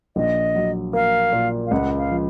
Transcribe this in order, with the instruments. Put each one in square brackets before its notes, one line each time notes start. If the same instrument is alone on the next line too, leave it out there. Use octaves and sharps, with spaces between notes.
[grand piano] A#1 [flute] D#5
[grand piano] F#3
[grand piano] A#3 [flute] F5
[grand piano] A#2
[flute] F5
[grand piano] C#2 [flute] F#5
[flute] F5
[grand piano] F3